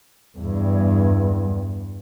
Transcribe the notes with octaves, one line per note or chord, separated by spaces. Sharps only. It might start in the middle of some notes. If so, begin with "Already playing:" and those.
E2 G2